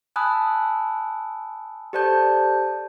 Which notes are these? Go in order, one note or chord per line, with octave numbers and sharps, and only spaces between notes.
G#5 A5 B5 D#6 E6 F#6
G4 A4 C5 D5 A5 G6